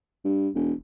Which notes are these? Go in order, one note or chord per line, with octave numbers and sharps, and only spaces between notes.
G2
E1